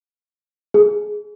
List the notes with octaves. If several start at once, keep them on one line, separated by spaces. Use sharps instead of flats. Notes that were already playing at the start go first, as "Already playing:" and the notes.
G#4